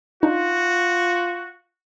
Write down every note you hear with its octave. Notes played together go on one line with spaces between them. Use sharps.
D4 D#4 F4 F#4